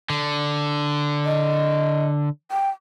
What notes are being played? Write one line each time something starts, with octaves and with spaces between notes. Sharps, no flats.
D3
D#5
G5